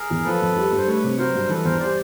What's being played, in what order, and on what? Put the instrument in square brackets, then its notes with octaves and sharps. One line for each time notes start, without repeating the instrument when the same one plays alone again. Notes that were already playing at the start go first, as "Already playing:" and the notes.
Already playing: [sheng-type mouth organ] G#4 A#4
[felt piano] E2
[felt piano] F3 [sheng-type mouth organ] A4 B4
[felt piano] F2
G3
G2
[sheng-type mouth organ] C5
[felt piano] A3 [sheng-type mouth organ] B4 C#5
[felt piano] C3
[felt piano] F#3 [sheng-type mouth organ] A#4 C5
[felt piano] G2
[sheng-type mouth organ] A#4
[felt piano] E3 [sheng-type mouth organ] A4 B4
[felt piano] E2 [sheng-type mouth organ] A#4 C5
[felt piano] G3 [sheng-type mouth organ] C5 D5